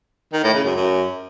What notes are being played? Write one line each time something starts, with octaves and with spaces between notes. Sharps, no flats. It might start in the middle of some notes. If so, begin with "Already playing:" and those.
D#3
A2
C#3
F#2
F#2